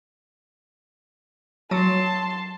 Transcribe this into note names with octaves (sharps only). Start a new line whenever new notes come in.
F#3 A5 C6